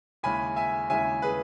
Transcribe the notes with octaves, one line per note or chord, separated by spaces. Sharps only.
D#2 C#3 G#3 C#4 E4 G#5 B5
E5 G#5
D#2 C#3 G#3 C#4 E4 E5 G#5
G#4 B4